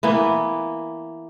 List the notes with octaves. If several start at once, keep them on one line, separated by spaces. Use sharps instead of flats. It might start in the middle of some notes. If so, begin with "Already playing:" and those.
E3 A#3 B3